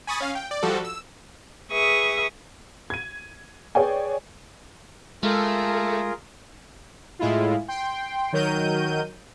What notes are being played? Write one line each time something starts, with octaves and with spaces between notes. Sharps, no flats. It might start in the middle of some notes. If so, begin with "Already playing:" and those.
G#5 B5 C#6 D#6 A6
C#4 F5
G5
D5
F3 G3 F#4 A4
E6
G#4 B4 E5 C#6 D#6
G#6 D#7
G#4 B4 C#5 D5 G5 G#5
G#3 A3 F4 G#4 A#4
A2 G#3 E4 F4
G5 C6
D#3 F#3 A#4 G6 D#7